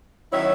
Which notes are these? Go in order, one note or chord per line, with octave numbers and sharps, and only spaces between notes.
D#3 F#3 C#4 E4 C#5 E5